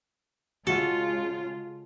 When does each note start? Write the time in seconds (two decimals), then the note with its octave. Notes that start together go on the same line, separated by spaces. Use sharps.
0.67 C#3 G#3 F4 F#4 A4 F5